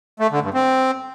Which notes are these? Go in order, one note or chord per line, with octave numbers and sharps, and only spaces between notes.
A3
D3
G2
C4